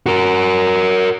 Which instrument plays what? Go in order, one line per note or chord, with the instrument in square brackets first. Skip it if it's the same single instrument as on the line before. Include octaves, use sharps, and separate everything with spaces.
[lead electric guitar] F#4 A#4